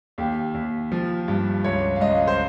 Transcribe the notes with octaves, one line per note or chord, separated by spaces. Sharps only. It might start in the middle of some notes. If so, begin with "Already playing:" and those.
D#2 G4
D#2
F3
G2
C#2 C#5
F5
C#2 D#5
C5